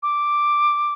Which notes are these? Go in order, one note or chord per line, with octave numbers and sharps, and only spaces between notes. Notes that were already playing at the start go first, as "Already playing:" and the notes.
D6